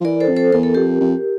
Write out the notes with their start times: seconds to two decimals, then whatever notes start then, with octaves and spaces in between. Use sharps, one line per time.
0.01 F3
0.05 E3 A#4 D5
0.20 A4 C5
0.28 F2
0.36 A4 C5
0.53 E2 A#4
0.63 A4
0.74 F2 G4 A#4
1.00 F2